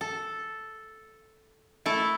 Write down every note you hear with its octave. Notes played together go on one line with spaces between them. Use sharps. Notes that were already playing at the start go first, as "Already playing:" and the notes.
A4
A3 E4 A4